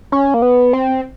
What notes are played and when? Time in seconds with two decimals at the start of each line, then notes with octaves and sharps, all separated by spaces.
0.12 C#4
0.34 A#3
0.42 B3
0.73 C4